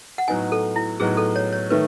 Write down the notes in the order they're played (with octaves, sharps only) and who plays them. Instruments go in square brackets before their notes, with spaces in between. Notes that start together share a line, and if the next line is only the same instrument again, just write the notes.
[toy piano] F#5
[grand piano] A2 F#3 B3 D#4 [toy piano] G#5
[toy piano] A4
E4
[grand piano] A2 F#3 B3 D#4 [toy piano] G#4
[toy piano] A4
C#5
C#5
[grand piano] D#3 A3 [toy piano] B4